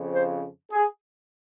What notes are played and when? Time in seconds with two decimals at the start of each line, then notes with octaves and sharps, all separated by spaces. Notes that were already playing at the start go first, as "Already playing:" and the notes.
Already playing: F2 C#3 F3
0.13 C5
0.71 G#4